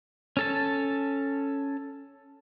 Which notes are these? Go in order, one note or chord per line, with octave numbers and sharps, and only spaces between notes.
C#4 A4 A5